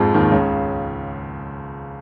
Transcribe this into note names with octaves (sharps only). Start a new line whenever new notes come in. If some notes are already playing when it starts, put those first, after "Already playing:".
Already playing: F2 G#2 F3 G#3
D#2 D#3
C#2 C#3